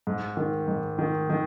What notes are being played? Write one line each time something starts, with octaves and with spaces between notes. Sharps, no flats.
G#2
D#3
G#2
D#3
D#3